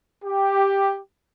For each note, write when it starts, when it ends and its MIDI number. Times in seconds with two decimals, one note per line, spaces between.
0.25 0.98 67